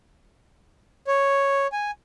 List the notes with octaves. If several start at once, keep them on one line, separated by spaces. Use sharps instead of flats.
C#5
G#5